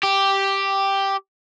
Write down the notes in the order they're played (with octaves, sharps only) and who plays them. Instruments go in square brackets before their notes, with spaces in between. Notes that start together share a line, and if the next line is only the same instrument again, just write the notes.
[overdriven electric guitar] G4